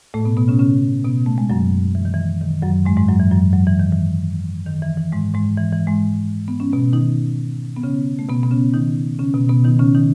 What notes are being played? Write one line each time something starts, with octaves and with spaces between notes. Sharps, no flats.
A2 A3
B2 B3
B2 B3
C#3 C#4
C#3 C#4
B2 B3
A3
G#3
F#2 F#3
E3
D#3
E3
D#3
F#2 F#3
G#2 G#3
G#2 G#3
F#2 F#3
E3
F#2 F#3
F#3
E3
D#3
E3
D#3
E3
E3
G#2 G#3
G#2 G#3
E3
E3
G#2 G#3
B3
C#4
B2 B3
D#3 D#4
B3
C#3 C#4
A3
B2 B3
B3
C#3 C#4
D#3 D#4
C#3 C#4
B2 B3
B2 B3
D#3 D#4
C#3 C#4
D#3 D#4